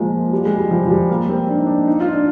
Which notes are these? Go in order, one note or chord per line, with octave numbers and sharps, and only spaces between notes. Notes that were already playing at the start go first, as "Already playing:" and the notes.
Already playing: F3 G#3 A#3
G3
G#3
G3
F3
F3
G3
A#3
C4
D4
D#4
D4
D#4
F4
D4